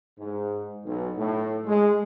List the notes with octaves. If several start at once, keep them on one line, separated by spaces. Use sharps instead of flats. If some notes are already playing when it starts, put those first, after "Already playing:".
G#2
B1
A2
G#3